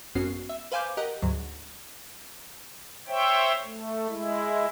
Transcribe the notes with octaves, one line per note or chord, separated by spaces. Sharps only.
G#1 F#2 B3 C#4 F#4 C7
E5
B4 C5 F5 G#5 D6 G6
G4 A#4 D#5 F#5
D2 G#2 F#3
C5 C#5 E5 G5
A3
G#3 E4